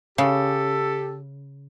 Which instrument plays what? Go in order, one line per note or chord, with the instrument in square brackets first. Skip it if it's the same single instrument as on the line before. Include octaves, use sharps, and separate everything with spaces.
[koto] C#3 [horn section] G4 A4